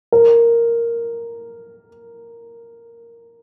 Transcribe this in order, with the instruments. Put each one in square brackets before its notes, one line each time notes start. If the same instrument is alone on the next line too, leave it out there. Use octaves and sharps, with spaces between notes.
[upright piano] A#4